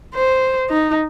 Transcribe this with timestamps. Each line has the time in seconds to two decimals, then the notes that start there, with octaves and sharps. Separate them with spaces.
0.15 C5
0.70 D#4